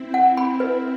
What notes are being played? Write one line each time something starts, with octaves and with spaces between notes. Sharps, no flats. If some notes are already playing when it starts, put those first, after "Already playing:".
Already playing: C4 E4
F#5
B5
B4